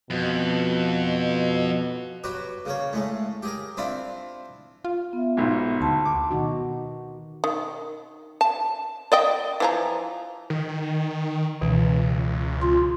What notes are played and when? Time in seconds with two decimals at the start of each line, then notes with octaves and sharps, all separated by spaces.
0.10 F2 B2
2.24 F#3 F#4 G4 B4
2.66 C#3 A#3 C#5
2.93 A2 G#3 A3
3.43 G4 G#4 A#4
3.77 C4 D4 E4 F4 B5
4.85 F4
5.13 B3 E5
5.37 B1 G#2
5.81 D2 F#5 A5 C6
6.05 D6
6.31 B2 D#3 D#4 F#4
7.44 D#3
8.41 A5
9.12 D5 D#5 G5
9.60 E3 F3 A#5
10.50 D#3
11.61 C#2 B2 E3
12.62 F4